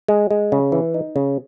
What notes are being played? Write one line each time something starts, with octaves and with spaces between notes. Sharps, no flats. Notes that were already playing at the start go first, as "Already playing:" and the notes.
G#3
G#3
C#3
E3
D#4
C#3